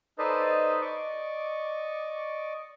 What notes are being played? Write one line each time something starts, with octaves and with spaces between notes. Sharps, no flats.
D#4 A4 B4 C5 D5 D#5
D5 D#5 C#6 D6